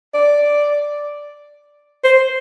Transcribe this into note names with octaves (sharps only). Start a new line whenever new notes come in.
D5
C5